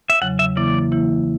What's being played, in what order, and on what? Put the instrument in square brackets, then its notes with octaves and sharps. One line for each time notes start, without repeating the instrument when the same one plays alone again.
[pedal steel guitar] E5
[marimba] E2 C#3 F#3 [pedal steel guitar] F#5
[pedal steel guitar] E5
[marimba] C#3 E3 A#3 E4 [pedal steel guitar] D5
[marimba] C#3 E3 A#3 E4